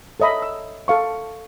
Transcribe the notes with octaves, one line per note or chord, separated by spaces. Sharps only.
A4 C#5 D#5 E5 B5
E6
A4 F5 C#6